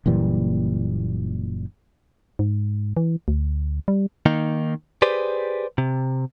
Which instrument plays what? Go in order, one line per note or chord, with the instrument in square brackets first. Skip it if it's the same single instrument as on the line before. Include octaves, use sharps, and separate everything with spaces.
[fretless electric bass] F#1 A#2 E3 G3
[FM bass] G#2
E3
D2
G3
[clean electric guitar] D#3 A#3 D#4
G4 G#4 B4 C5 D5
C3